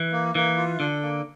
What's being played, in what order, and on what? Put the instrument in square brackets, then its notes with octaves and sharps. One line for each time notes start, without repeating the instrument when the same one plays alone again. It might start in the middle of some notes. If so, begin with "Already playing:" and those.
Already playing: [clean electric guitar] E3
[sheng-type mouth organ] A#3
[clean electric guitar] E3 [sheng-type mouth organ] A#3
[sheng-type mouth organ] F4
[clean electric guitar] D3 [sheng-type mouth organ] A4
[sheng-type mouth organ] A#3